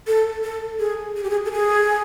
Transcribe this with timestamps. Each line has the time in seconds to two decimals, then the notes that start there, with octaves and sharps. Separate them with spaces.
0.07 A4
0.44 A4
0.79 G#4
1.16 G#4
1.24 G4
1.30 G#4
1.45 A4
1.52 G#4